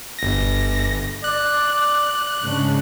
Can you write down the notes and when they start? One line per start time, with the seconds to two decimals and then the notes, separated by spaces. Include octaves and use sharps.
0.19 G1 A#6
1.24 D5 F#6
2.42 G#2 C#3 D4